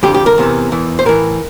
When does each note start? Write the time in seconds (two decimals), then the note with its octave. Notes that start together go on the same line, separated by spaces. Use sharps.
0.03 F2 D3 G4
0.14 G4
0.26 A#4
0.38 E2 C3 E3
0.72 E2 E3
0.99 C5
1.05 A2 E3 A#4